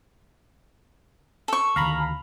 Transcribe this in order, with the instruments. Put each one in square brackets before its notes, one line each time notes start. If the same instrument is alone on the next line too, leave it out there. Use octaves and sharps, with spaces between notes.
[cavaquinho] A4 C#6
[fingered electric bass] D2 D#3 [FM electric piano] F5 A#5 B5